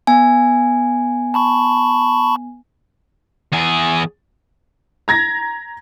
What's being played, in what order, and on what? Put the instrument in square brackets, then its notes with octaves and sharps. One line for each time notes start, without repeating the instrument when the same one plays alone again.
[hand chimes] B3 G#5
[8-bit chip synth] A5 B5 C#6
[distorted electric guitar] E2 G#4
[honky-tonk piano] A#5 G#6 A#6